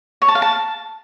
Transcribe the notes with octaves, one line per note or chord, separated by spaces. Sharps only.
C#5
A5
F5
A5